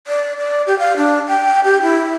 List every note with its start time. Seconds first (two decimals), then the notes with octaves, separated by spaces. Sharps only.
0.07 D5
0.38 D5
0.67 G4
0.79 F5
0.97 D4
1.28 G5
1.64 G4
1.82 E4